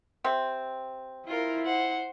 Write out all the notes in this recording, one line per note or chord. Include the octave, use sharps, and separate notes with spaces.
C3 C4
E4 F4 A#4
C5 F#5